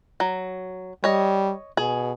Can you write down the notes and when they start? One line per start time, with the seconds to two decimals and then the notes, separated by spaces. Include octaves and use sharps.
0.20 F#3
1.04 G3 C#5 D#5
1.77 B2 G#4